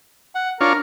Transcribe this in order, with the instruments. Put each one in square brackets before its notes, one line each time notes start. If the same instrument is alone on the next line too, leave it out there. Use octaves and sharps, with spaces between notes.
[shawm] F#5
[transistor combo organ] D4 F4 C#5 [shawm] A#4